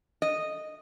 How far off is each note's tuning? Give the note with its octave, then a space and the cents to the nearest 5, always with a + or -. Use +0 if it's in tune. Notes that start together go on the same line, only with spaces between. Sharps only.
D#5 -5